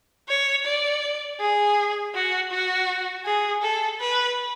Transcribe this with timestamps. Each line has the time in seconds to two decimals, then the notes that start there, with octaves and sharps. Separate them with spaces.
0.29 C#5
0.66 D5
1.40 G#4
2.15 F#4
2.51 F#4
3.25 G#4
3.62 A4
4.00 B4